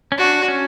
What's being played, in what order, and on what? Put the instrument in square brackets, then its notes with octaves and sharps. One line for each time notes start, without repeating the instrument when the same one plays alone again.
[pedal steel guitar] C#4
[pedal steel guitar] D4 [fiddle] F#4
[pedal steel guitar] C#4